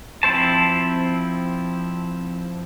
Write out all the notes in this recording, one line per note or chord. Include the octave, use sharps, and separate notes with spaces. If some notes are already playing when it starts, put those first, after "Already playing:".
F3 C4 E4 C5 A5